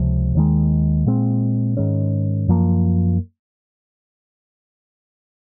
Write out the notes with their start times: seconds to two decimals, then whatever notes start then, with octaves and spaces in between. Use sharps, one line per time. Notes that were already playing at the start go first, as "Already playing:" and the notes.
Already playing: C#2 C3 F3
0.35 D#2 D#3 G#3
1.06 A#2 G#3 C4
1.77 G#2 D#3 G#3 C#4
2.48 F#2 F3 A#3